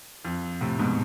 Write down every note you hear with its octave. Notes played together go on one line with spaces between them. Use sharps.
F2
A2 C3
G#2 B2